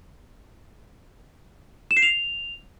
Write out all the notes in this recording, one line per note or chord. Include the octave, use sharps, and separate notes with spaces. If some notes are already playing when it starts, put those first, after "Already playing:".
E7
C7
F7